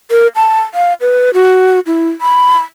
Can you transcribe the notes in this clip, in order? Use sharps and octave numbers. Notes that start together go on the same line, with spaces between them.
A#4
A5
F5
B4
F#4
E4
B5